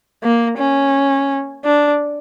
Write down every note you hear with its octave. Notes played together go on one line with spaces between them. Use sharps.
A#3
C#4
D4